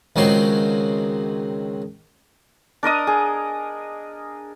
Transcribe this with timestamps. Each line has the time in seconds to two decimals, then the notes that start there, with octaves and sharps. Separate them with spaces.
0.16 C#2 D#3 F#3 C4 C6
2.83 D4 A#4 D#5 D#6
3.07 G#4